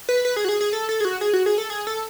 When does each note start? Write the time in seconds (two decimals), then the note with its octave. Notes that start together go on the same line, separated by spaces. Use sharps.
0.09 B4
0.25 B4
0.36 G#4
0.45 F#4
0.49 G#4
0.61 G#4
0.73 A4
0.89 A4
1.00 G#4
1.05 F#4
1.21 G#4
1.33 F#4
1.46 G#4
1.58 A4
1.70 G#4
1.87 A4